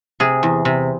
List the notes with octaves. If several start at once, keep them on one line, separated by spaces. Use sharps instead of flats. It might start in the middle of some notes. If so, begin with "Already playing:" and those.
C3 G#4
E2
C3